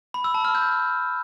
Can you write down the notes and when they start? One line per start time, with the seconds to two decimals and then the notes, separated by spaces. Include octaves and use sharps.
0.14 B5
0.24 E6
0.34 A5
0.45 F6
0.55 G6